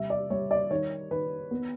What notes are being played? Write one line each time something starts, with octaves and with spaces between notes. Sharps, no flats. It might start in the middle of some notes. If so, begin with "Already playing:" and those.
Already playing: C3 G3 E5
D5
G3 C#5
D5
D#3 C#5
D#3 B4
B3